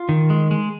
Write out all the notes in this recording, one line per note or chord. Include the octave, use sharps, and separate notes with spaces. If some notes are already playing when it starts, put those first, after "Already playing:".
Already playing: F4
D#3
G#3
G#3